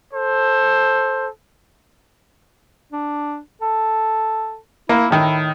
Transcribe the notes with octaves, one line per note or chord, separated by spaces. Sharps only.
A4 C5
D4
A4
A#3 E4
A2 D#3 E4